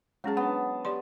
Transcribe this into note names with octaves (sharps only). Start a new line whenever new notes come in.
F#3 G#3 C#4 G#4 A5
B3 D4 F#5
G4 D5 C6